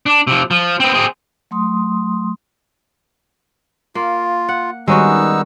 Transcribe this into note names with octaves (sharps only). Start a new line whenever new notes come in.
D4
C3 F3
F3
B3 C4
C4 G#4
F#3 A3 C6 D#6
A#3 F4
F#5
D#3 G3 G#3 B3 C#4 D#4 F#4 E6